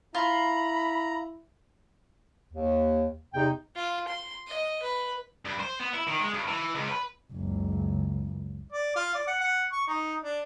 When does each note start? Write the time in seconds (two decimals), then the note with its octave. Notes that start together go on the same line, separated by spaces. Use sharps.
0.15 E4 F4 A#5 B5
2.53 D#2
3.34 E2 C3 D#4 G5
3.76 F4
4.08 C6
4.47 D#5
4.83 B4
5.45 G2
5.60 C5
5.80 B3
5.94 E4
6.07 D#3
6.20 G#3
6.34 G2
6.48 E3
6.74 C#2
6.88 B4
7.33 F#1 C#2
8.72 D5
8.96 F4
9.15 D5
9.27 F#5
9.41 F#5
9.72 C#6
9.88 D#4
10.23 D4